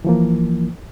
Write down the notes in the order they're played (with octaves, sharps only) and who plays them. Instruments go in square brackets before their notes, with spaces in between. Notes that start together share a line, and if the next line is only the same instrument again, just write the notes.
[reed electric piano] E3 F3 A#3